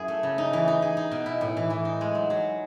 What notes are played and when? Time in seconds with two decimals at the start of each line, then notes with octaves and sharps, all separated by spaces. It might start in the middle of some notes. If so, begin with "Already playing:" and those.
Already playing: F#2 E4 G#4
0.08 A3
0.23 C#3
0.38 D#4
0.53 E3
0.68 D#4
0.82 G#4
0.97 D#4
1.11 B2
1.26 E4
1.41 A2
1.57 E3
1.70 E3
1.85 D#4
2.01 G#3
2.15 F#3
2.30 F#3